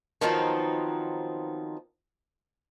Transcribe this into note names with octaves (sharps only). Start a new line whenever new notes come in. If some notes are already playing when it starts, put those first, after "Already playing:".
D#3 F3 F#3 B3 C4 D#4